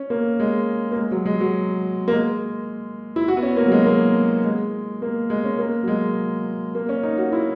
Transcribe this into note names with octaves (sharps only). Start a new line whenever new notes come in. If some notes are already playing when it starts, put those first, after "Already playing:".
Already playing: C#4
A#3
G#3
A#3
G#3
F#3
G#3
F#3
A#3
G#3
E4
F#4
B3
C#4
A#3
F#3
G#3
A#3
G#3
A#3
G#3
C#4
A#3
F#3
G#3
A#3
C#4
D#4
F#4
E4